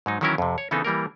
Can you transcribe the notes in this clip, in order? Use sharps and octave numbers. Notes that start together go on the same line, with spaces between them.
G#2 F#3 D#4
D#3 E3 F#3 C#4 E4 A#4
F2 C3
C#5
C#3 E3 B3 C4 D#4 A4
E3 G3 A#3 A#4